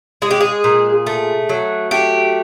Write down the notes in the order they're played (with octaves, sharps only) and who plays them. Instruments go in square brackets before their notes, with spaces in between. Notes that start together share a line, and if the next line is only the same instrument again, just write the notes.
[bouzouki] G#3 G#4
G4
G#4
A#2
A3
F#3
A3 G4